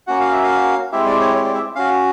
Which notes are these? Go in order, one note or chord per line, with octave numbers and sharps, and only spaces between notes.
A#3 C#4 F#4 F#5
F5
E5
F5
G#3 C4 E4 G4 E5
D5
C#5
C#5
D5
E5
C#4 F#4 F5